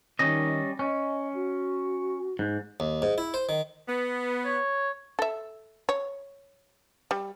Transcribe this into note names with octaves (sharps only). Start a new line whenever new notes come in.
D#3 G3 C#4 D#5
C#4 D#5
F#4
G#2
D#2
G#2
E4
C5
D#3
B3
C#5
A4 E5
C#5
G3